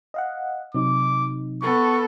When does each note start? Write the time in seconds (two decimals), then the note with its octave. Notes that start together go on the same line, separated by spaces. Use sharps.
0.14 D#5 F5 F#5
0.75 C3 F#3 D#4 D6
1.62 B3 A4 C#6